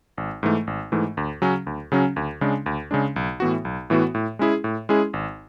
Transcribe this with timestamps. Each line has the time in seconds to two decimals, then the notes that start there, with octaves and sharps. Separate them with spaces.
0.17 G#1
0.43 G#2 E3 A3
0.67 G#1
0.92 G#2 E3 A3
1.17 D2
1.42 C#3 F#3 C#4
1.67 D2
1.92 C#3 F#3 C#4
2.16 D2
2.41 C#3 G#3 D4
2.66 D2
2.91 C#3 G#3 D4
3.16 B1
3.40 A2 E3 B3 F#4
3.65 B1
3.90 A2 E3 B3 F#4
4.15 A2
4.39 G#3 C#4 E4 G#4
4.64 A2
4.89 G#3 C#4 E4 G#4
5.13 G#1